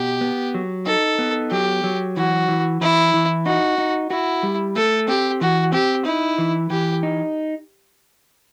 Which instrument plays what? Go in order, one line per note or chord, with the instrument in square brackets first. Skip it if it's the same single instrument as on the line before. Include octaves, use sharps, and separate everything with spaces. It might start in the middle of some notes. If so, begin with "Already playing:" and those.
Already playing: [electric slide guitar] B2 [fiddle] G4
[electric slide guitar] B3
F#3
[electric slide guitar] D#4 [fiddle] A4
[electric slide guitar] B3
[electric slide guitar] F#3 [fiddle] G4
[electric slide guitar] F#3
[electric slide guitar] E3 [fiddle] F#4
[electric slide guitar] E3
[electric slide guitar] E3 [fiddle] E4
[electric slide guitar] E3
[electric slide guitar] D#4 [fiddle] F#4
[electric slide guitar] D#4
[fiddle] E4 [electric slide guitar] F#4
[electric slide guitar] G3
[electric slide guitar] A3 [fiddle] A4
[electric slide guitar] C4 [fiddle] G4
[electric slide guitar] E3 [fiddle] F#4
[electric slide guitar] C4 [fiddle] G4
[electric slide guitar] D#4 [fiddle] E4
[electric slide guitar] E3
[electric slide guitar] E3 [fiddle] G4
[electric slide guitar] D#4